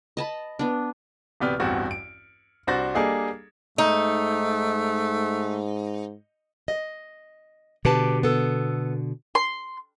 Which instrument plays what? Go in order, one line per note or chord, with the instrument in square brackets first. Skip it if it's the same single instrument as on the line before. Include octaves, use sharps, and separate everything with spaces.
[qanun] D#5 A5 B5
B3 D4
[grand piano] D1 C3 B3 D5 G5 F6
A1 E2 G2 C4 F#4
D7
C2 D4 F#4 C5 A6 A#6
G3 A#3 D4 G#4 A4 D#5
[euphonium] G#2 [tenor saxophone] A3 [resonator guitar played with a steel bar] D#4
[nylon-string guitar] D#5
[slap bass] B2 D3 [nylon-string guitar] G4 B4 A5
[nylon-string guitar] B3 A4
[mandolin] C6